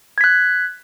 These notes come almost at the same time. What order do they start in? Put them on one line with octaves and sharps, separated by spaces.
G#6 B6 F#6